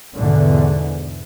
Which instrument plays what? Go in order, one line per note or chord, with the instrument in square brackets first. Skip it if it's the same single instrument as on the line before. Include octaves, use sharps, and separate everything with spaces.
[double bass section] E2 G#2 B2 D3 E3